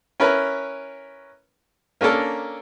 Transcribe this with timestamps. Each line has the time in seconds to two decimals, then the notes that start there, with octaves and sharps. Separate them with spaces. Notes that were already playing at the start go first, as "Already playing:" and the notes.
0.20 C#4 E4 A#4 B4 C#5
2.01 A#3 C#4 D4 A4 A#4